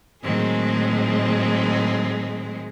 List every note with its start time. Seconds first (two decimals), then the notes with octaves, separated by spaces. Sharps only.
0.22 A2 D#3 F#3 G#3 C4 G#4